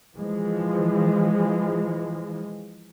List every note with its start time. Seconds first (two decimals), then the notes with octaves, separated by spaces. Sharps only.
0.17 E3 F3 G#3